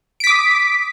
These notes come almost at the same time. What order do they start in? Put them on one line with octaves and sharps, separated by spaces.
D7 B6 D6 D#6